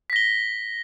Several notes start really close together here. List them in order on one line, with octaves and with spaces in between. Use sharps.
B6 A#6 G7